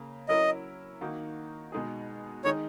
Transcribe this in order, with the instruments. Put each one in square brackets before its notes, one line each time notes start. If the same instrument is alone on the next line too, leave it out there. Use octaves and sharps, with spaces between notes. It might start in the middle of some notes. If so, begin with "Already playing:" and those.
Already playing: [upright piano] C#3 A#3
[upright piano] F#3 C#4 E4 A#4 [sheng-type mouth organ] D#5
[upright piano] D#3 A#3 D#4 F#4
B2 G#3 D#4 G#4
[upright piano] D#3 G#3 D#4 [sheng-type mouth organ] C#5